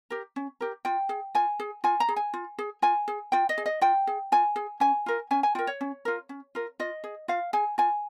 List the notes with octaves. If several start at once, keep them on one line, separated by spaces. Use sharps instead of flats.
G4 A#4
C#4
G4 A#4
F4 G5
G#4
F4 G#5
G#4
F4 G#5
A#5
G#4
G#5
F4
G#4
F4 G#5
G#4
F4 G5
D#5
G#4
D#5
F4 G5
G#4
F4 G#5
G#4
C#4 G#5
F4 A#4
C#4 G#5
G#5
F4 A#4 G5
C#5
C#4
F4 A#4
C#4
F4 A#4
F4 D#5
G#4
F4 F5
G#4 G#5
F4 G#5